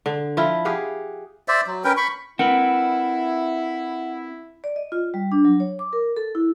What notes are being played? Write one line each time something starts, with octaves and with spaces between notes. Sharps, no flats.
D3
F3 E4 F4
G4 G#4 F5 F#5
C5 D5 E5
F#3
C#4 A#4 B4 G5
B5 C#6
C4 E4 A#4 B4 F#5
D5
D#5
F4
G3
D4
F#3
C#5
D6
A#4
A4
E4